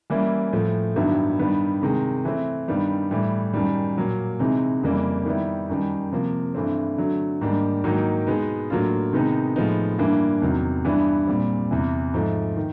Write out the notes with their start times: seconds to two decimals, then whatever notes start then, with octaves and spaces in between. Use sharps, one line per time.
0.10 E3 G3 A#3 C#4 E4
0.53 A2 F3 A3
0.96 G2 D#3 F#3 B3 E4
1.39 G2 D#3 G3 B3
1.82 C3 D#3 G#3
2.25 E3 A3 C4
2.68 G2 D#3 G3 B3
3.11 A2 E3 G3
3.54 F#2 D#3 G3
3.97 A#2 F#3 A#3
4.39 C3 E3 G#3 C4 D#4
4.83 F2 C#3 E3 G3 A#3
5.25 D#3 G3 B3 E4
5.69 F#2 D#3 G3
6.12 C3 F3 A#3
6.55 G2 E3 A3 C4
6.98 D3 F#3 A3
7.41 G#2 D#3 G3 A#3 D4
7.84 G#2 D#3 F#3 A#3 D#4
8.27 B2 G#3 B3 D#4
8.70 A2 F#3 A#3 D4 F4
9.13 C3 D#3 G#3 B3 D#4
9.56 A2 F3 G#3 B3 D#4
9.99 G2 E3 G3 A#3 D4
10.42 E2 C3 D#3 F#3
10.85 G2 E3 G3 B3 D4
11.27 A#2 G3 C4
11.71 E2 C3 E3
12.14 G#2 F3 A3
12.57 D#3